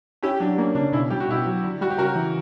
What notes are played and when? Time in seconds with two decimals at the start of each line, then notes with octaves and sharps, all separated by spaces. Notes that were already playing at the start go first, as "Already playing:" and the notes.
0.22 C#4 E4 G4
0.40 F#3 D4
0.58 A#3 C#4
0.75 C#3 D4
0.92 B2 C#4 E4
1.10 G3 G4
1.20 F#4
1.29 B2 E4 G4
1.46 F#3
1.64 D3
1.81 G3 F#4
1.90 G4
1.98 C#3 F#4 A#4
2.16 E3